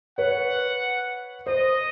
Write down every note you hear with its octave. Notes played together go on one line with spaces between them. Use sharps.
B4 C#5 F#5
C5 D#5